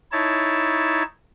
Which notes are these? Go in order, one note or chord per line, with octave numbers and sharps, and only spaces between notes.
D#4 E4 C#5 A5